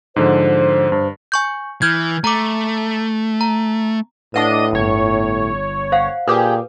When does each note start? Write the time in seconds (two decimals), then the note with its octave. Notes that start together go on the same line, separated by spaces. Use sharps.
0.16 G#2 D3 F3 C5
0.92 G2
1.32 G#5 C#6 G6
1.82 E3 F6 G6 G#6
2.24 A3 A#5 D6
3.41 A#5
4.34 A2 D4 B4 D#5 F#5 D#7
4.73 G1 C#5
5.92 C5 F5 F#5
6.28 A#2 G4 G#4 B4